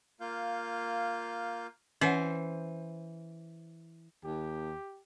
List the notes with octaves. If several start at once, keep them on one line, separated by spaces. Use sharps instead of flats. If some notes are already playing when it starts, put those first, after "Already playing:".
A#3 F4 F5 G6
E3 C#4 C5 C#5 F#5
D#2 G4